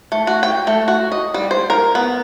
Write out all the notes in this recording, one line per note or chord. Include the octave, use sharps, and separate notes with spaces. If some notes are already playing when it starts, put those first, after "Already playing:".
A3
F#4
G5
A3
F#4
D#5
G3
C5
A#4
B3